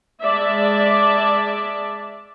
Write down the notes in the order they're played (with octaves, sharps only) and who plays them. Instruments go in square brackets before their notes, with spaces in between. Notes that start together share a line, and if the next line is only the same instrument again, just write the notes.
[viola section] G#3 D5 E5 A5